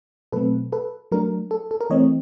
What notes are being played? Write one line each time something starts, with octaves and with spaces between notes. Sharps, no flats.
B2 F#3 A3 C4 A4 B4
A4 B4
F#3 A3 D4 A#4
A4
A4
A#4
E3 A3 C4 C#5 D#5